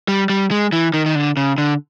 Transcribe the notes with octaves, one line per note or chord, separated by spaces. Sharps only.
G3
G3
G#3
E3
D#3
D#3
D3
C#3
D3